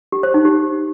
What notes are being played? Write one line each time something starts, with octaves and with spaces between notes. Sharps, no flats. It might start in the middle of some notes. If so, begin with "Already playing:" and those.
G4
C5
D#4
G4